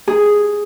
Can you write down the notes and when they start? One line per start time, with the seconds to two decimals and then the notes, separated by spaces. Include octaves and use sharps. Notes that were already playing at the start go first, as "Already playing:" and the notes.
0.08 G#4